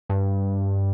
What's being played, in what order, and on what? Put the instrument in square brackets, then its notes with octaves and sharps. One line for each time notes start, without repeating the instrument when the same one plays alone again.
[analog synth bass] G2